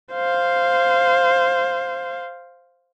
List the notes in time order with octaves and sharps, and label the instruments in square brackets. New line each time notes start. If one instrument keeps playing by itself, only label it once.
[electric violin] C5 F5